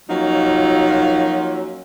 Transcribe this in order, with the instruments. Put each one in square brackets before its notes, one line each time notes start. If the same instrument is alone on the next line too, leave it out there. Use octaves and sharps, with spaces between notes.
[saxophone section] F3 F#3 A#3 C#4 D#4 F4